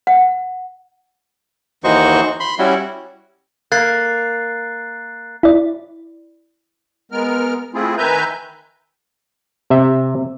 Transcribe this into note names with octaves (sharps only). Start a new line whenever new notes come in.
F#5
D#2 E3 D#4 F#4 C5 C#6
B5 C6
G3 C#4 E4 F#4
A#3 F#6 A6 C7
E4 D5
G#3 B3 A#4 F6
A3 C4 E4 F4 G#4
D#3 B4 E5 G#5 A#5 G6
C3 E5